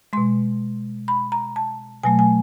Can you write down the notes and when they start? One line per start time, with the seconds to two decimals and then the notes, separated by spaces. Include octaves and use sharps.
0.13 B2 G#3 C6
1.08 B5
1.32 A#5
1.56 A5
2.03 B2 F#3 A3 G#5
2.19 G#5